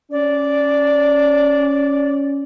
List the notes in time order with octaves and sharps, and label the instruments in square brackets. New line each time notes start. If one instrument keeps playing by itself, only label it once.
[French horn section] C#4 [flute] D5